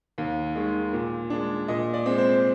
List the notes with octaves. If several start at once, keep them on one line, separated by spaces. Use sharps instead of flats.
D#2
D#3 G#3
A#2
G#3 D4
A#2 D#5
D5
G#3 C4
C5